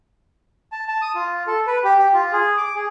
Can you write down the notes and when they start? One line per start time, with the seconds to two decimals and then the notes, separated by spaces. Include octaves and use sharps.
0.72 A5
0.88 A5
1.02 D#6
1.15 F4
1.47 A4
1.67 B4
1.84 G4
1.98 G4
2.14 F4
2.33 G#4
2.57 D6
2.75 G#4